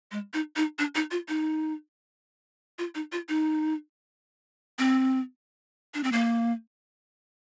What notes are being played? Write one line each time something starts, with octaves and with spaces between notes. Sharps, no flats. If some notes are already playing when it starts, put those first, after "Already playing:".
G#3
D#4
D#4
D4
D#4
F4
D#4
F4
D#4
F4
D#4
C4
D4
C4
A#3